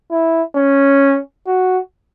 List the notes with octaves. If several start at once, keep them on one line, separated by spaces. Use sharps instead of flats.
E4
C#4
F#4